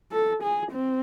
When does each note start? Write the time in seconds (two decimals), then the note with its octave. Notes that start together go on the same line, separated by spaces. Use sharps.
0.12 A4
0.43 G#4
0.72 C4